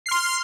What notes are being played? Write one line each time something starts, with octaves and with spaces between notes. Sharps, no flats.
C6 F6 C7